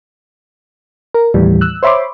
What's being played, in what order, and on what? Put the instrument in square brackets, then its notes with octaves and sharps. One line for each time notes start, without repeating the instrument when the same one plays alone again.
[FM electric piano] A#4
D#2 A2 E3 G3
E6 F#6
C5 C#5 E5 B5 C6 D6